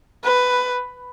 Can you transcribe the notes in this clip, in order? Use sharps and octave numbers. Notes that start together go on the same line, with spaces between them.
B4